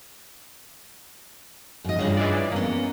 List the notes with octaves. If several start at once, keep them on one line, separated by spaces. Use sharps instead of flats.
F#2 D#5
G2 C#3 D4 F4
E3 G#3 D5
A#3 B3 C#4